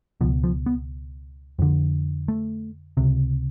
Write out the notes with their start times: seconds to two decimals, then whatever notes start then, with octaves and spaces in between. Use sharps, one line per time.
0.21 C#2 B2 F3
0.44 F3
0.66 B3
1.59 F2 D3
2.28 A3
2.97 C#2 C3